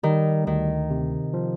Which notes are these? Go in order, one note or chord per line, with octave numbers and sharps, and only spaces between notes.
D#3 G3
D2 D#3
C3
F3